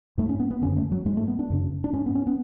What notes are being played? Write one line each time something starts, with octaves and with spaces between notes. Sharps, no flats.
G#2 A3
C#4
B3
B3
F#2 D3 C#4
A3
F#3
G#2 G#3
A3
B3
D4
F#2 C#3
D4
G#2 C#4
B3
C#4
B3